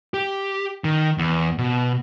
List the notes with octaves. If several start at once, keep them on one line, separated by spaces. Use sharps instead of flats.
G4
D#3
E2
B2